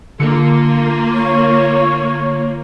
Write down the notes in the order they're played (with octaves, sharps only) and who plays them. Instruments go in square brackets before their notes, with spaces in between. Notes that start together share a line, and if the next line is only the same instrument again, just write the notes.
[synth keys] D3 C#7 [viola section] A#3 F4
[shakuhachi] C#5